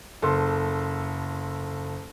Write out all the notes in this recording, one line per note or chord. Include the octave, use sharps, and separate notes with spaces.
F#1 A4 C6